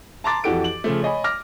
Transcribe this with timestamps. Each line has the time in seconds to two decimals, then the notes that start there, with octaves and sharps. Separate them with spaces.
0.24 A5 A#5 C6 D6 A6
0.44 F2 E3 F#4 G4 A4 D7
0.64 F#7
0.84 C#3 F3 A3
1.02 C#5 D#5 G#5 B5
1.24 D6 F6 A#6